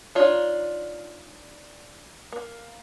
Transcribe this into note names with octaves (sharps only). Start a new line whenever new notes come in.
D4 D#4 F4 C#5
A#3